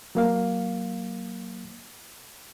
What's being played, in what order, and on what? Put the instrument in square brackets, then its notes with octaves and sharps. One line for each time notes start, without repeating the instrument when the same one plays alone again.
[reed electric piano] F#3 A#3 F5